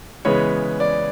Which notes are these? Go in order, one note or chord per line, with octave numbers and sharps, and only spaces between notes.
C#3 E3 G#3 B3 C#5
D5